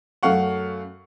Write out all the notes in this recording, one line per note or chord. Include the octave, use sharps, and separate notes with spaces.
F#2 A3 F5 F#5 C#6